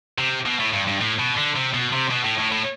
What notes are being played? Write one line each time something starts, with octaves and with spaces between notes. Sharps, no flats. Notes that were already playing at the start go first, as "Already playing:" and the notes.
C3
B2
A2
G2
G2
A2
B2
D3
C3
B2
C3
B2
A2
A2
A2